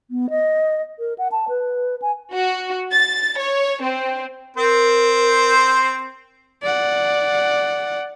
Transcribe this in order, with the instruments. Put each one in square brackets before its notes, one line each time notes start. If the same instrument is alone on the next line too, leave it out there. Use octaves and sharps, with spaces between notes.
[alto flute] B3
D#5
A#4
F#5
A5
B4
G#5
[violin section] F#4
A6
C#5
C4
[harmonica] C4 C5 [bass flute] A#4
[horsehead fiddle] D5 F#5